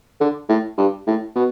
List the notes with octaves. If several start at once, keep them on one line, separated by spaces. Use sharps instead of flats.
D3
A2
G2
A2
B2